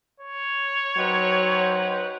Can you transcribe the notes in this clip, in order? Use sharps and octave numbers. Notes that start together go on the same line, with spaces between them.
C#5
F#3 C4 D#4 B4